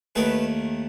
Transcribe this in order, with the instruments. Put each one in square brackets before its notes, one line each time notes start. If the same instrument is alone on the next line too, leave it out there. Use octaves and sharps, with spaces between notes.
[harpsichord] D#2 D#3 A3 B4 D#5